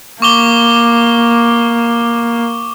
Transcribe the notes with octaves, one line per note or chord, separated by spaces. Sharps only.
A#3 C#6 D6 G7